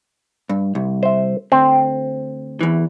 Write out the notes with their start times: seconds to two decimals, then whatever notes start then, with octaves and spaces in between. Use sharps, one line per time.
0.49 G2
0.75 C2
1.03 C5 E5
1.52 D2 C4
2.61 E2 E3